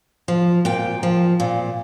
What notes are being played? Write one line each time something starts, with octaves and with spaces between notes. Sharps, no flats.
F3
A#2 G5
F3
A#2